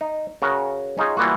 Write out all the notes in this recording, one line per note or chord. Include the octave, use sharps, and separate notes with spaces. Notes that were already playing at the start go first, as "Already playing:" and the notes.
D#4
C#3 F#4 A#4
C#4 D#4 F4 G#4
E3 G3 A#3 B3 F4 F#4